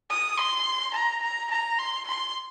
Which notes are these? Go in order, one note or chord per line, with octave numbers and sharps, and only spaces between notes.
D#6
C6
A#5
A#5
A#5
C6
C6